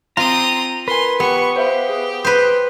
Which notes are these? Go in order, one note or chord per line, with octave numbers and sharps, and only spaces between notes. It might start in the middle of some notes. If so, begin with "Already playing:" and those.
C4 F4 A#5 D#6
A#4 B4 G#5 C6
B3 G4 C#6
G4 C5 E5 F5
G#4 D#6
B4 C5